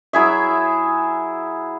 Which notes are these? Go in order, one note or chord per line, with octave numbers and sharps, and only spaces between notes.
F#3 E4 G#4 E5